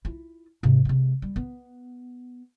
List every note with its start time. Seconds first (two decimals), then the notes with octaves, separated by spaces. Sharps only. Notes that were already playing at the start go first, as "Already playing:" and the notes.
0.05 E4 F4
0.63 G#2 C3
0.85 C3 G#3
1.22 G3
1.36 B3